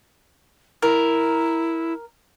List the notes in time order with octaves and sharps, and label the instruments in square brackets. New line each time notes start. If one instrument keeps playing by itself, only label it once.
[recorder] E4 [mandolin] A#4